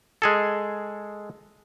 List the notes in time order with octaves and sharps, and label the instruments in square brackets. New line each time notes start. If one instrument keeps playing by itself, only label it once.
[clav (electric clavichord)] G#3 G#4 A4